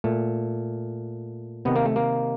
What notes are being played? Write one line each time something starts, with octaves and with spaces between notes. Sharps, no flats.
A#2 A3
C3 D#3 B3
A#3
A3
A#3